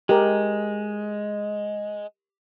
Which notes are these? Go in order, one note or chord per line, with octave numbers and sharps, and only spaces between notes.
G#3 G4 A#4